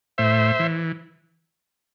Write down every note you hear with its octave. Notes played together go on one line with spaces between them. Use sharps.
A2 C5 E5
E3